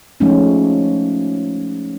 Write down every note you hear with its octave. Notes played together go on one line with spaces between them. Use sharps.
F3 G#3 A3 C#4 D#4